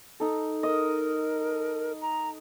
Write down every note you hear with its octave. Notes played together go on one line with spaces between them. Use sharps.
D#4 A4
A#4 D#5
A#5